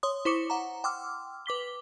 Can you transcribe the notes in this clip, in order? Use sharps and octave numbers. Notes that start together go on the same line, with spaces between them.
C#5 C6 D#6
E4 C5 C#6 D6 C#7 E7
F#5 A#5
G5 C6 D6 E6 F6
B4 D6 B6 G7